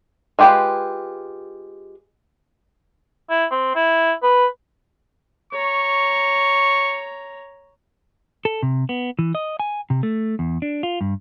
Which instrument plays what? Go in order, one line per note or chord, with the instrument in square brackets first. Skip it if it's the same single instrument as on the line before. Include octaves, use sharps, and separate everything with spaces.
[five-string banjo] G#3 F4 G4 B4
[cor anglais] E4
C4
E4
B4
[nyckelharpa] C#5 A#5 [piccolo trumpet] C#6
[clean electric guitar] A4
C3
B3
E3
D#5
G#5
C3
A3
E2
D4
F4
G2